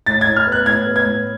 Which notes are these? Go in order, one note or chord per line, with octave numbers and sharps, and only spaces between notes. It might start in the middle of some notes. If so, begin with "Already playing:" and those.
A2 A6
G#6
A2
F6
B3
F#6
A2 G#6
B3
G#6
A2